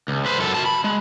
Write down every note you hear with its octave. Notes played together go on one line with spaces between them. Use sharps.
C#2
B4 C5
F#2 A4
F#4 A5
B5
G#3